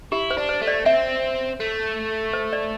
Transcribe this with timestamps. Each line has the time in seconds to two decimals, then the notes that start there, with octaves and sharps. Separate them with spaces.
0.12 E4 G4
0.31 C5
0.37 D4
0.49 C5
0.61 A3
0.67 D5
0.86 C4 E5
1.60 A3
2.33 C5
2.53 D5